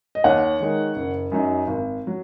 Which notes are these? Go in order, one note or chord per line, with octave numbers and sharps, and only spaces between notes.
D#5
D#2 C#5 F#5
D#3 G#3 D#4
F#1
F#2 F#3 D#4
G#1
F#3